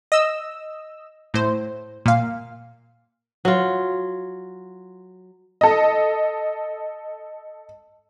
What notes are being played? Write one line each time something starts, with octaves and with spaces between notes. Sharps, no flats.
D#5 E6
A2 C5
A#2 F5
F#3 F4
A4 D#5